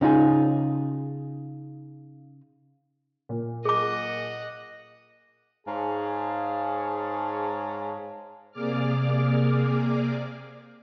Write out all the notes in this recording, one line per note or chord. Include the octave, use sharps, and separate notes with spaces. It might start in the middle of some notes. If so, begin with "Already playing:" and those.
C#3 D#4 F4 G#4
A#2
G#4 D#5 F#5 D6
G#2 G#4 C#5 F5 A5
C3 A#3 G#4 D5 D6 F6